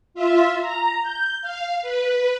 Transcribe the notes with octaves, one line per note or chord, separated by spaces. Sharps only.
F4 E5
A#5
G6
F5
B4